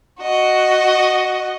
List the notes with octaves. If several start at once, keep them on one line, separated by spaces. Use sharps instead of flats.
F#4 D#5